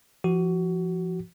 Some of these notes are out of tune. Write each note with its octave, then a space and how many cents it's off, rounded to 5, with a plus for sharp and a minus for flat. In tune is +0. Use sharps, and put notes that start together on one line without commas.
F3 -25 F#4 +20